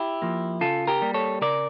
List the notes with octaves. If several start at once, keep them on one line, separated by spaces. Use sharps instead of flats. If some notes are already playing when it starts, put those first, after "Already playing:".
Already playing: E4 G4
F3 A#3
C#3 F4 A4
G4 A#4
G3 A#3
A4 C#5
C#3 A#4 D5